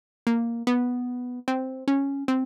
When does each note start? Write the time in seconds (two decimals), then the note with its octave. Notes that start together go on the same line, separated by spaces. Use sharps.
0.27 A#3
0.67 B3
1.48 C4
1.88 C#4
2.28 C4